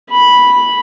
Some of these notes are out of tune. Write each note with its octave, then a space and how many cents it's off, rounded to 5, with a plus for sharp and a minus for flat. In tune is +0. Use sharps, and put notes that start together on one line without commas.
B5 -5